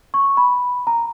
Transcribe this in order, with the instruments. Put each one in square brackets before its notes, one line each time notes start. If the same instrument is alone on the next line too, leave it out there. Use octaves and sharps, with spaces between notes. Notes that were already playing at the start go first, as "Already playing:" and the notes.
[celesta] C#6
B5
A#5